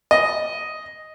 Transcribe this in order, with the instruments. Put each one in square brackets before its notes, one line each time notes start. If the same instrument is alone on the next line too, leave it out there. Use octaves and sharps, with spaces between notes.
[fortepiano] D#5